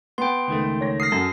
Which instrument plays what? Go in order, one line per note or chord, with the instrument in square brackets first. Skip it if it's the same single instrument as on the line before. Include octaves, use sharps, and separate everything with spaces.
[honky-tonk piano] B3 [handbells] G5 C6
[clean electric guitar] C#2 D#3 A3
[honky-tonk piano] C#5 A#6
[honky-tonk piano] D#6 F6 [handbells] A#6 C7
[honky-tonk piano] F#2 [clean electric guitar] A4